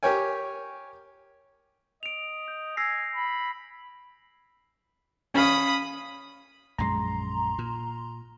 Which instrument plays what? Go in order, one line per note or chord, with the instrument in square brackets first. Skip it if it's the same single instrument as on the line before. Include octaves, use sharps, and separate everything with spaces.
[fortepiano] G4 A#4 C#5 G5 G#5
[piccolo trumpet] D#5 [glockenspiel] D7 F7
[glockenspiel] G6
[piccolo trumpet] G#5 [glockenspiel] E6 A#6 C7
[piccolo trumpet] B5
[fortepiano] C#4 F5 [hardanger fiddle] B5 D#6
[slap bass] A#1 F#2 G#3 [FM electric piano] A#5 C6
[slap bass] A#2